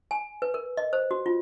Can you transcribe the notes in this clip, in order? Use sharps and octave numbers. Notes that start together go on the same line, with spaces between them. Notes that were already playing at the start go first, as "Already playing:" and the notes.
G#5
B4
A#4
D#5
C5
F#4
F4